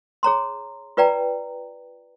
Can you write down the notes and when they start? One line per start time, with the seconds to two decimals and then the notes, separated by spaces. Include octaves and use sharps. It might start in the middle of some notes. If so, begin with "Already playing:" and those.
0.23 G#4 C#5 A#5 C6
0.97 F4 B4 D5 G5 A#5